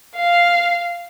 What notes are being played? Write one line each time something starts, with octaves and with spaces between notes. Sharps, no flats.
F5